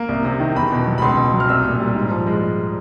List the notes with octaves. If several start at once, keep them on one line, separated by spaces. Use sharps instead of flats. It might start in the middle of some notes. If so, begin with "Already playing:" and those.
Already playing: A#3
C2
C3
D#3
E2 B5
B2
F#3
B5
C#2 C6
B2
F#3
F6
C2 E6
A#2
G3
G#2
F3
G#3